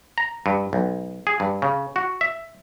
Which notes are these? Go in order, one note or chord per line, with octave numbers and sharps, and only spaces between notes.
A#5
G2
B1
G#4
G2
C#3
F#4
E5